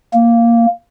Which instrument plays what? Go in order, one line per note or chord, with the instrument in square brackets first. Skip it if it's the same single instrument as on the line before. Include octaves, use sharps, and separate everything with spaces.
[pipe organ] A#3